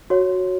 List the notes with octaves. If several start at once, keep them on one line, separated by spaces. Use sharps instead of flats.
F#4 C#5